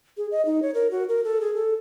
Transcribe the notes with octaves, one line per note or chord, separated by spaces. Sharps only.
G#4
D#5
D#4
C#5
A#4
F#4
A#4
A4
G#4
A4